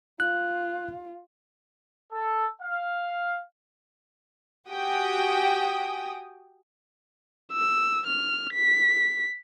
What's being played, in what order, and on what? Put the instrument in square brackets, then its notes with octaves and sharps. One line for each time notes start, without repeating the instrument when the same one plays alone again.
[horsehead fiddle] F4 [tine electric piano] F#6
[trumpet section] A4
F5
[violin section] F#4 G4 G5 G#5 D#6
[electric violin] E6
F6
B6